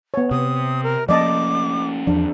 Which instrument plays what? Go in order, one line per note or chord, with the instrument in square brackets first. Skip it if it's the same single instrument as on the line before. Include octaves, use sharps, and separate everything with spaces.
[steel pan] B3 C#5
[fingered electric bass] C3 [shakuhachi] D#6
[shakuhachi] A#4
[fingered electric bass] F3 A#3 C#4 [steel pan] D5 D#5 A5 [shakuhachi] D6
[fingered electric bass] E2 F3 [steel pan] D4